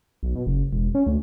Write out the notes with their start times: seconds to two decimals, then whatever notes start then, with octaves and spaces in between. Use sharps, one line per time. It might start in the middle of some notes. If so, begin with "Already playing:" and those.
0.23 B1
0.35 B2
0.46 F#1
0.73 E1
0.95 C#4
1.07 D2